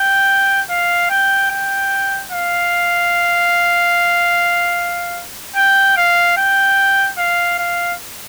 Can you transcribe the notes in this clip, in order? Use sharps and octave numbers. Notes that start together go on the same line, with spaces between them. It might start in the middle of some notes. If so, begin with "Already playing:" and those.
Already playing: G5
F5
G5
G5
F5
G5
F5
G5
F5
F5